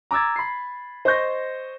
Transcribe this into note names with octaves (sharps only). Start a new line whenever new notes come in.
A#5 D6 E6 G#6 A6
B5 C7
C5 D#5 C#6 G6 A#6